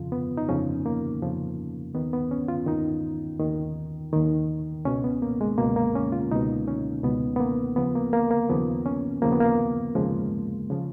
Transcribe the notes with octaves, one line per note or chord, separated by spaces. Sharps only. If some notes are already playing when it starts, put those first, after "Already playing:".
Already playing: F2 C#3 F3 F4
B3
D#4
F2 C#3 F3 C#4
A#3
F2 C#3 F3
D#2 D#3 B3
B3
C#4
F4
D#2 D#3 D#4
D#2 D#3
D#2 D#3
C#2 B2 C#4
B3
A#3
G#3
C#2 B2 A#3
A#3
C#4
F4
C#2 B2 D#4
C#4
C#2 B2 B3
B3
A#3
D#2 C#3 F3 B3
A#3
A#3
A#3
D#2 C#3 F3 B3
C#4
D#2 C#3 F3 A#3
B3
A#3
D#2 C#3 F3 G#3
C#3 F3